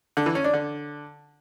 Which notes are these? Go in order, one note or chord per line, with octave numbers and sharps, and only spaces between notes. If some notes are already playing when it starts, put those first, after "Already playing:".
D3
E3
C#4
D4
D3